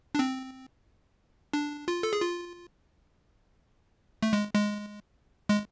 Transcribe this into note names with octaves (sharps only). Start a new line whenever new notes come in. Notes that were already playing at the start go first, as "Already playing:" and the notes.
D4
C4
D4
F4
A4
G#4
F4
A3
G#3
G#3
G#3